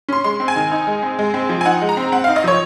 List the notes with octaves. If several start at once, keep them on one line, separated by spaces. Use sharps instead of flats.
C#4 C6
G#3 C6
C4
G#5
D#3
D#4
G#3
C4
G#3
C4
F3
G#5
D#4 F#5
G#3
A#5
C4
C4 F#5
D#4 F5
D#5
F3 C#5